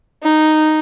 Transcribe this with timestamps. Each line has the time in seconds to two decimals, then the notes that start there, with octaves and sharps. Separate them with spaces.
0.23 D#4